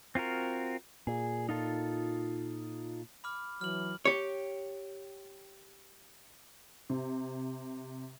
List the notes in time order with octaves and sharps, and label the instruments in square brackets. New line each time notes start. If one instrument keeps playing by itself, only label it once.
[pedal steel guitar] C4 F4 F#4 A#4
[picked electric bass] A#2 [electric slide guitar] G#4
[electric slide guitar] D#4 F4 A4
[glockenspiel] B5 D6 F6
[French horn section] E3 F#3 [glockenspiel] F6 F#7
[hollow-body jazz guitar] G4 C#5
[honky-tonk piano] C3